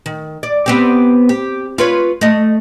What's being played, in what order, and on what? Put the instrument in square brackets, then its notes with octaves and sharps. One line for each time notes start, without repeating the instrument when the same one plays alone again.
[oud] D#3
D5
B3 C4 G4
G4
F4 B4 C#5
A3 D#5